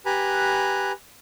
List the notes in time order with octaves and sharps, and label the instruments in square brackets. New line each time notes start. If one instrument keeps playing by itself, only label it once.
[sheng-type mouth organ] G4 B4 G#5 A#5 B5 F#6